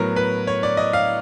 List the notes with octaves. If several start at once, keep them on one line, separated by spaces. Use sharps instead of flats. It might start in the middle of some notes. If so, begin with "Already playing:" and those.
Already playing: A2 F#3 B3 A#4
B4
C#5
D5
D#5
F5